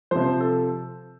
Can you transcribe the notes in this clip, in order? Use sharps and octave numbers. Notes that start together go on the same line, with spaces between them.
C3 F3 C5
A4